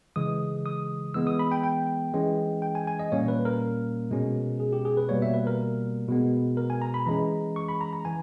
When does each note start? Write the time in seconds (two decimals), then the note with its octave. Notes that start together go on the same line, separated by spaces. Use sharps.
0.16 C#3 E3 G#3 D#6
0.66 D#6
1.14 E3 G#3 B3 E6
1.27 D#6
1.39 B5
1.52 G5
1.63 G5
2.14 E3 G#3 C#4
2.62 G5
2.75 G#5
2.87 G#5
2.99 D#5
3.12 A#2 G3 A#3 C#4 C#5
3.28 B4
3.45 A#4
4.11 B2 G#3 C#4
4.60 G#4
4.73 G4
4.85 G#4
4.97 B4
5.09 B2 G3 A#3 C#5
5.22 E5
5.34 B4
5.47 A#4
6.08 B2 G#3 B3
6.57 A#4
6.70 G#5
6.82 A#5
6.94 B5
7.06 E3 G#3 C#4 A#5
7.56 C#6
7.68 B5
7.81 A#5
7.93 A#5
8.05 E3 G#5